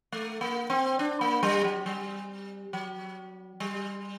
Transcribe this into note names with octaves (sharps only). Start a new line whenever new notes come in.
A3
A#3
C4
D4
A#3
G3
F#3
G3
F#3
G3